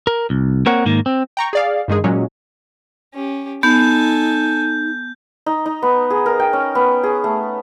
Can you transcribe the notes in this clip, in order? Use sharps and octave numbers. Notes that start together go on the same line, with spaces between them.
A#4
C2
A#3 C4 A#4 C#5 F#5
G#2 D#3 A#3
C4
G5 A#5 C#6
G#4 D5 F5
G2 D#3 G#3 G#4
A#2 F#3 G#3 C#4
C#4 G4
B3 D#4 A4 G#5 G6
D#4
D#4
B3
G#4
A#4
G5
C#4
B3
G#4
A3